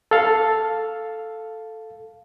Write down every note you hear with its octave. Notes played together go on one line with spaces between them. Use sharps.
A4 F5